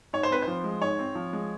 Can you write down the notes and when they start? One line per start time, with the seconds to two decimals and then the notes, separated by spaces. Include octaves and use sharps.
0.13 G#2 C#5
0.23 C5
0.31 C4 B4
0.42 C5
0.48 F3
0.64 G#3
0.82 G#2 C#5
0.99 C4
1.15 F3
1.33 G#3